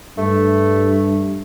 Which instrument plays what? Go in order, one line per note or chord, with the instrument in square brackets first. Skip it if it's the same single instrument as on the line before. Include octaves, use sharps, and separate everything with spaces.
[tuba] G2 [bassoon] A3